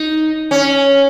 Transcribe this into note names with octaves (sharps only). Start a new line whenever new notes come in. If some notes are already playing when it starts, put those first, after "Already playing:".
Already playing: D#4
C#4